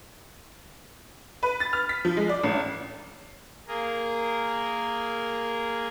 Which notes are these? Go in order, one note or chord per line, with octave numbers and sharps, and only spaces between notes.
B4
A6
F6
B6
F3
G#3
D5
A1
A#3 G#4 A#4